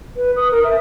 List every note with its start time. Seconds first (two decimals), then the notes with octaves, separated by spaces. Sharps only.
0.16 B4
0.36 D#6
0.51 A#4
0.64 E5